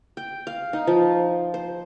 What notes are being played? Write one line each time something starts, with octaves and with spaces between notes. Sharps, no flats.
G5
F5
D#4
F3
C5